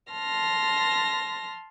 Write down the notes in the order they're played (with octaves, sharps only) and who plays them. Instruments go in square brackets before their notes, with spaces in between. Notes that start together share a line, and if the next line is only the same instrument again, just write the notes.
[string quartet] A5 C6 F6 A#6